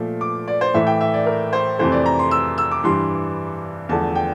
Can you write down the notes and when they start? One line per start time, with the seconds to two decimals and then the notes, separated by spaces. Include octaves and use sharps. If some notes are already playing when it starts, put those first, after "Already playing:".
Already playing: A#2 F3 A3
0.21 D6
0.48 D5
0.61 C5
0.74 A2 E3 A3 E5
0.87 G5
1.01 E5
1.14 D5
1.26 A#4
1.53 C5
1.79 F2 C3 E3 A3 C5
1.92 D5
2.06 A#5
2.19 C6
2.31 E6
2.58 E6
2.71 D6
2.84 G2 E3 G3 C6
3.89 E2 D3 F3 A3 A5
4.15 G5